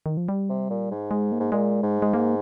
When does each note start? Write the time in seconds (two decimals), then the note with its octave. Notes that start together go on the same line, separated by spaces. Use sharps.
0.06 D#3
0.17 F3
0.29 G3
0.49 C3
0.70 A#2
0.91 G#2
1.11 G#3
1.32 A#3
1.40 G#2
1.52 A#2 G#3
1.83 G#2
2.02 G#3
2.14 A#3